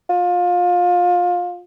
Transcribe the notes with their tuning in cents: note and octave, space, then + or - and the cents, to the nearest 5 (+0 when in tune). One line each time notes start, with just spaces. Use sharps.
F4 +25